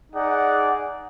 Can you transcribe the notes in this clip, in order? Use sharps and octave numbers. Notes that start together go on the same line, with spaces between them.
D#4 G#4 D5 F#5